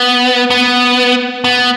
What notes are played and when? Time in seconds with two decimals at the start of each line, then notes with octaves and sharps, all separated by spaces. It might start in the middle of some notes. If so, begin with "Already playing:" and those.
Already playing: B3
0.50 B3
1.44 B3